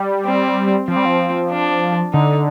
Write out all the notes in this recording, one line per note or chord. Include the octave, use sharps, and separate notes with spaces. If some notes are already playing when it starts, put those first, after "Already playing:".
Already playing: G3
C4
F3 C4
G3
F3
D4
D3 D#4